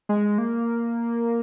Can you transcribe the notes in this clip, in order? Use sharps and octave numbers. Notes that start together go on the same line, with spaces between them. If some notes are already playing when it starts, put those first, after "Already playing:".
G#3
A#3